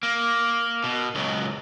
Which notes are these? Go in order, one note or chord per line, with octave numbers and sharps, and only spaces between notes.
A#3
B2
C#2 F#3